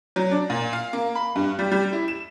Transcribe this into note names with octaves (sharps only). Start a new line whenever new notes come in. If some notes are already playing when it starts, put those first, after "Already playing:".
F#3
D4
A#2
F5
A#3
B5
G2
G3
G3
E4
E7